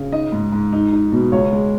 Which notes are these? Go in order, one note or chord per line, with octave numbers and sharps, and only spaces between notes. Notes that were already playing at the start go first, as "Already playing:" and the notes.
Already playing: C#3
D#4 D#5
G#2
G#2
D#4
D#4
B2
C#2 C#5
G#3